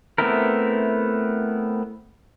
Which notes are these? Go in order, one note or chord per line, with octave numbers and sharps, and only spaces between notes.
A3 B3 C4 E4 A#4